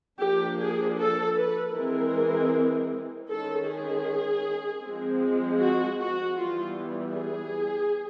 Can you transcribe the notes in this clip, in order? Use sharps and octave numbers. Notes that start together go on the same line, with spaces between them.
F3 A#3 D4 G4
G#4
A4
B4
E3 G#3 C4 A#4
D#3 G#3 C#4 A4
G#4
F3 G#3 C4
F#4
F#4
E3 G3 B3 F4
G#4